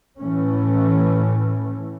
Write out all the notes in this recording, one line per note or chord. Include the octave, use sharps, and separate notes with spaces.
A2 E3 A3 C#4